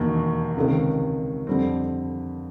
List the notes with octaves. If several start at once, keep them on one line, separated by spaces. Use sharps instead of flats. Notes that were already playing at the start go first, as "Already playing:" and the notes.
Already playing: E1 D#2 D#3
C#2 C3 D#3
F2 D3 G3 C4